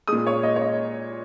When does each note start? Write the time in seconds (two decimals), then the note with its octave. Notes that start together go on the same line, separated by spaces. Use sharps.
0.08 A#2 G#3 D#6
0.27 C#5
0.43 D#5
0.56 C#5
0.61 D#5